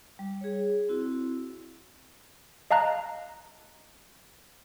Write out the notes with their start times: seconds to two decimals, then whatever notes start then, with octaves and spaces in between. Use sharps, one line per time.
0.19 G3
0.41 G#4 C#5
0.89 C4 E4 F#4
2.71 D#5 F5 A5 A#5 F#6